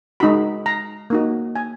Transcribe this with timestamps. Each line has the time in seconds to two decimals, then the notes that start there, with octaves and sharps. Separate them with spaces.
0.20 G#3 D#4 F#4 B5
0.66 A#5
1.10 A#3 D#4 F#4
1.56 G#5